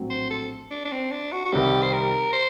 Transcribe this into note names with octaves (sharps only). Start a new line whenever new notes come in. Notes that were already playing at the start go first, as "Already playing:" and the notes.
Already playing: A#1 A2 F#3 C4
C5
A4
D4
D4
C4
D4
F#4
F#4
C2 C3 D#3 G3 C4 G4
C5
A#4
C5